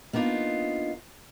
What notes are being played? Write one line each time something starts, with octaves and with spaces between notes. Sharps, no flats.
A#3 B3 D4 D#4 F4